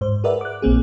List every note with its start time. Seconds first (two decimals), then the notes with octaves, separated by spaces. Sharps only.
0.01 G#2 C5
0.24 G#4 A#4 B4 D5 E5 F#5
0.41 D6 F#6
0.62 A#1 A#3 C4 G#4